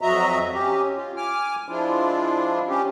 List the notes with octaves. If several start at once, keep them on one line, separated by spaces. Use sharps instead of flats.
F2 F#3 F#4 D#5 E5 A#5
C#4 G4
F4
G#5 D6 F6
F3 G#3 D4 E4 F4
C#4 G4